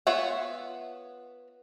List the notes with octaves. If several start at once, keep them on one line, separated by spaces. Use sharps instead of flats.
B3 F4 C#5 E5 F#5